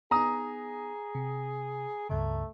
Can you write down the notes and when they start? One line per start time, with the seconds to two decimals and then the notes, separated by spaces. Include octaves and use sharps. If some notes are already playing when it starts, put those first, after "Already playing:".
0.11 B3 D#4 G#4 A#5 D#6
1.15 C3
2.09 C#2 G2 C#3 A3